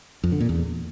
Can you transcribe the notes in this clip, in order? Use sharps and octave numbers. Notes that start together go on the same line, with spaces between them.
F2
D3
A#2
E2